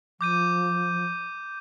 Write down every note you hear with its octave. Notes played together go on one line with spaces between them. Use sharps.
F3 D6 G6 D#7